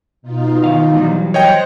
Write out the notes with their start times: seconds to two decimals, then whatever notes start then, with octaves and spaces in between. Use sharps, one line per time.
0.22 B2 D#4 F4
0.64 D#3 F5
0.93 E3 F#3 G3
1.34 C5 C#5 D#5 G5 F#6 A#6